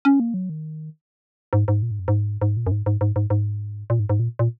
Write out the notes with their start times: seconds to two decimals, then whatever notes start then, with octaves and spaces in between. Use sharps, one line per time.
0.05 C#4
0.20 A#3
0.34 F#3
0.50 D#3
1.53 G#2
1.68 G#2
1.82 A#2
1.91 G#2
1.99 F#2
2.08 G#2
2.42 G#2
2.57 A#2
2.67 F#2
2.71 G#2
2.86 G#2
3.01 G#2
3.16 G#2
3.30 G#2
3.90 A#2
3.99 G#2
4.10 G#2
4.20 A#2
4.39 A#2